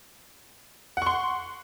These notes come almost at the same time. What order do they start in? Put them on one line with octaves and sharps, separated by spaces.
F#5 C#6 C6